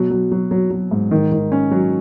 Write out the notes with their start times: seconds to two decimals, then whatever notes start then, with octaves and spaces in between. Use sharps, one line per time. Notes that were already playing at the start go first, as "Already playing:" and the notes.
Already playing: B2 F#3
0.11 F#3
0.32 F#3
0.51 F#3
0.71 F#3
0.91 G#2
1.11 D#3
1.32 D#3
1.52 C#4
1.71 F#3